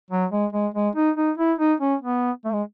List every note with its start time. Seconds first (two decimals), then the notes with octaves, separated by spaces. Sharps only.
0.11 F#3
0.31 G#3
0.52 G#3
0.74 G#3
0.96 D#4
1.16 D#4
1.38 E4
1.59 D#4
1.80 C#4
2.01 B3
2.45 A3
2.53 G#3